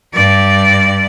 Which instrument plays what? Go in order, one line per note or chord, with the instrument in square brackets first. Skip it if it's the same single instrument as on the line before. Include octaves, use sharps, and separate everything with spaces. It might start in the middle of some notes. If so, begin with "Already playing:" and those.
[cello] G2 D5